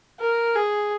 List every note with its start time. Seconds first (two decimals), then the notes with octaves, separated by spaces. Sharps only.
0.20 A#4
0.55 G#4